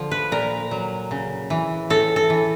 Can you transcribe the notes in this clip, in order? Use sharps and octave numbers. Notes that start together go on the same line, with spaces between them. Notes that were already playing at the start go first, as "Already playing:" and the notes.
Already playing: D3 F3
B4
A#2 A#4
F#3
C#3
E3
A2 A4
A4
E3